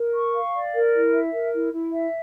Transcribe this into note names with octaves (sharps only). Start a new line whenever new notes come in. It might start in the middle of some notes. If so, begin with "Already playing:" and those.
Already playing: A#4
C#6
F5
D5
A#4
E4
E5
A#4
E4
E4
E5